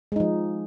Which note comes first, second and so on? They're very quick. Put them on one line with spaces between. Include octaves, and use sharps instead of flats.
G#3 D#4 F3